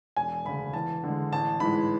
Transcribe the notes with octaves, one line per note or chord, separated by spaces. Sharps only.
E1 G#5
D2 C#3 B5
E2 A5
D3 G#3
A1 A5
G#2 E3 G#3 B5